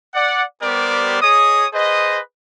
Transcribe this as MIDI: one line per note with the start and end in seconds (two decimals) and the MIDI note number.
0.14 0.43 74
0.14 0.43 78
0.62 1.21 55
0.62 1.21 59
0.62 1.21 67
0.62 1.21 70
0.62 1.21 72
0.62 1.21 74
1.21 1.66 68
1.21 1.66 73
1.21 1.66 75
1.21 1.66 87
1.73 2.19 68
1.73 2.19 71
1.73 2.19 72
1.73 2.19 75